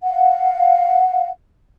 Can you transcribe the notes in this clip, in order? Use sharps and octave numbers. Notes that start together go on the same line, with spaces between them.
F5 F#5